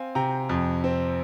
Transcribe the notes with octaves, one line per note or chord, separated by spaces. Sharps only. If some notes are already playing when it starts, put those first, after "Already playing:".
Already playing: C4 F5 G#5
C3 G5 A#5
F2
C4